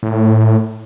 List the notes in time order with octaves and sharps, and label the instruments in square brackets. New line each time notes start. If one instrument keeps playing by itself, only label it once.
[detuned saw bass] A2